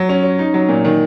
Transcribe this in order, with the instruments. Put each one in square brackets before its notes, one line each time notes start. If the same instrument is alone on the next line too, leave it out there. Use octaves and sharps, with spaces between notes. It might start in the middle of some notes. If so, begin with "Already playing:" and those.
Already playing: [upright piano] F#3
C#4
C#4
D#4
F#3
A#2
D#3